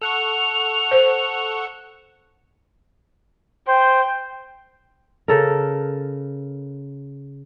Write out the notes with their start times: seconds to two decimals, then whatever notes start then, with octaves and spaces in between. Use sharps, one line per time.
0.02 A4 F#5 C#6 F7
0.91 C5
3.68 C5 G5
5.28 C#3 A4 A#4